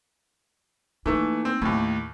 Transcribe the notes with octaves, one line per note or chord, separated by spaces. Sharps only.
E3 A3 A#3 D#4
C4
D#2 A2 A3